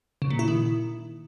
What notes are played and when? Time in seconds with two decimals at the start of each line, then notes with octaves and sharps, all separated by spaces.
0.22 C#3
0.30 A#2
0.39 E4
0.48 D#3